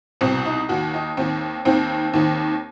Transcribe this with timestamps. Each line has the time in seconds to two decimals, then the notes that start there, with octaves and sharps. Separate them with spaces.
0.21 C2 B2 C4
0.45 D#4
0.69 D#2 D#3 F#4
0.94 D#4
1.17 D#2 D#3 C4
1.65 D#2 D#3 C4
2.13 D#2 D#3